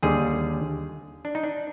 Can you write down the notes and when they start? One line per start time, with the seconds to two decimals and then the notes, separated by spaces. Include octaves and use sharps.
0.03 D#2 D3 G3 G#4
1.25 D4
1.35 D#4
1.43 D4